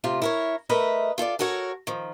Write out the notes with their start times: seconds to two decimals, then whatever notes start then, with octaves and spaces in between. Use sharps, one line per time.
0.04 C3 A3 F4
0.22 E4 A#4 C#5
0.69 A3 A#4 B4 D#5 E5
1.18 F4 A4 C5 D5
1.39 F#4 A4 A#4 C#5 F#5
1.87 D#3 F3